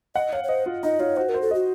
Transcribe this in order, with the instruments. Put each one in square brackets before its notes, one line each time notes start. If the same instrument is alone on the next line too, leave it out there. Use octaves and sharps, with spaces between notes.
[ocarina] D#5 [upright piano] F#5
[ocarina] C#5 [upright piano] F5
[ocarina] C#5
[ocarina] C5 [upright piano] D#5
[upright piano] F4
[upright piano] D#4 [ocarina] D#5
[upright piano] F4 [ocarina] C#5
[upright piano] F#4 [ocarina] C5
[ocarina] A#4
[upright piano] C5
[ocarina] A4
[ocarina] F#4 [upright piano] D#5